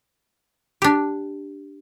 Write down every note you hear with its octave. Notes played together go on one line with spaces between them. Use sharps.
D4 G4